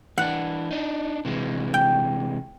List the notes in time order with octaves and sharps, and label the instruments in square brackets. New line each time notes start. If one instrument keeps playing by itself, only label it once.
[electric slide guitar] E3 D4 [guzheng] F#5
[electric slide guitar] D4 D#4
C3 E3 G#3
[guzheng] G5